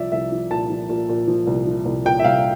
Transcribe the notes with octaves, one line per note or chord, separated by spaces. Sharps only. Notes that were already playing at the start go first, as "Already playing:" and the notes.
Already playing: C2 F3 D5 E5
C2 E5
F3
A#2 A5
F3
A#2
A#2
F3
C2
F3
C2
A#2 G5
E5
C2 F5